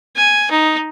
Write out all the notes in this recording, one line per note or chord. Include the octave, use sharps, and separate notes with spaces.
G#5
D#4